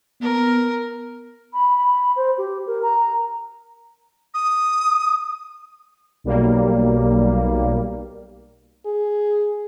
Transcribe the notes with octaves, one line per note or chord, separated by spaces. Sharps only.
B3 A#4
B5
B5
C5
G4
A#4
A#5
D#6
B1 G3 A#3
G#4